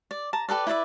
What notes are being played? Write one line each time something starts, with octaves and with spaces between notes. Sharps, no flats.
D5
A5 A#5
G4 A4 B4 D5
E4 B4 D5 E5